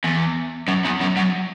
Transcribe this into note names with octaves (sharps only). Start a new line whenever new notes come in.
E2
F#2
E2
F#2
F#2